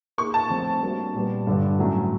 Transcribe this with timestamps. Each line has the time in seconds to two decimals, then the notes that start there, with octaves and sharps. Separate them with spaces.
0.18 A#3 D#4 G#4 C#6
0.34 A5
0.50 F3 A3 C4
0.82 G3 A#3 D4 F#4
1.15 A#2 G3 B3
1.47 G2 D3 G3
1.79 A2 F#3 A3 C#4